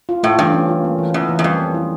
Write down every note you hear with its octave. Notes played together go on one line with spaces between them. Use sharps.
F4
A2 A3
G2 E3
C#4
F4
A#3
E3
E2 C#4
E3
E2
F2 G3
E3
E4